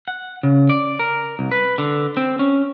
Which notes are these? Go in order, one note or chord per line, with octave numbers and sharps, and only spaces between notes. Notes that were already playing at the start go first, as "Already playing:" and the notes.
F#5
C#3
D5
A#4
C2
B4
D3
C4
C#4